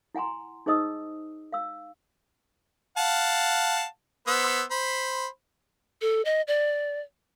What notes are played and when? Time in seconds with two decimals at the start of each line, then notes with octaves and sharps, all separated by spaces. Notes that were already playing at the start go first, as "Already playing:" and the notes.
0.15 E4 F#5 G#5 A#5 C6
0.66 D#4 G#4 C5 D#5 D#6 E6
1.52 F5 E6
2.97 F5 F#5 A5
4.27 B3 C5 E6
4.71 C5 B5
6.01 A4
6.25 D#5
6.48 D5